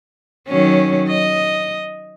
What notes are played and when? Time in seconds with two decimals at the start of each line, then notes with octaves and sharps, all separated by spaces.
0.48 D#3 F#3 C#4
1.08 D#5